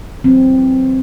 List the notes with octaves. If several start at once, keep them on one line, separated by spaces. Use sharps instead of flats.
E3 F#3 C4